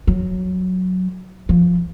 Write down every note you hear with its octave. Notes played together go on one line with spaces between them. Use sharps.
F#3
F3